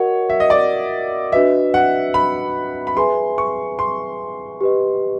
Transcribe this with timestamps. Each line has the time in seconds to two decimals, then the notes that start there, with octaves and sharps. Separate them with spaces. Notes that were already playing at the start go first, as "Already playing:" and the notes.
Already playing: F#4 A#4 C#5 D#5 F#5
0.30 E5
0.40 D#5
0.50 D5
1.32 D4 F#4 B4 D#5 E5
1.74 F#5
2.14 B5
2.87 B5
2.97 G#4 B4 E5 G#5 C6
3.38 C#6
3.79 C6
4.61 G4 B4 D#5